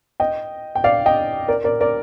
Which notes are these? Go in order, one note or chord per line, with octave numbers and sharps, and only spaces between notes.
D#5 G5
G5
D5 F5
D#5 G5
A#4 D5
A#4 D5
A#4 D5